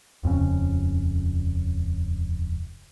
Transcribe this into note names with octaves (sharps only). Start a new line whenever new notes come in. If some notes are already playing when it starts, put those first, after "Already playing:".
D#1 F2 C#3 C#4